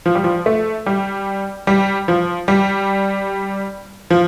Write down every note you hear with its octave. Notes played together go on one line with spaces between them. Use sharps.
F3
G3
F3
A3
G3
G3
F3
G3
F3